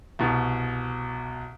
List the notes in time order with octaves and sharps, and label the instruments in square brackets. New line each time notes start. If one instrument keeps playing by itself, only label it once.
[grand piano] C2 B2